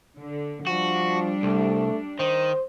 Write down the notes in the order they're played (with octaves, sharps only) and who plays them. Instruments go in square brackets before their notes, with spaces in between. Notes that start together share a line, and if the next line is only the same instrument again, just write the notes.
[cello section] D3
[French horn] F3 [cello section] G3 D4 [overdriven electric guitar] F#4
[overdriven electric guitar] C2 [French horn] A3
[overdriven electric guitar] D#3 [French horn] C5